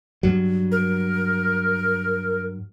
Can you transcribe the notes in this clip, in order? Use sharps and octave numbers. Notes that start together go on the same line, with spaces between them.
G2 F#3
A#4